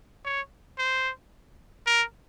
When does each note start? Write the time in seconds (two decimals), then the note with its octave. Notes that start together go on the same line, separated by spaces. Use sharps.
0.25 C#5
0.78 C5
1.87 A#4